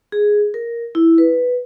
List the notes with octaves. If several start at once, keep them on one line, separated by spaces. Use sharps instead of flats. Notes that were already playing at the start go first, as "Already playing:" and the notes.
G#4
A#4
E4
B4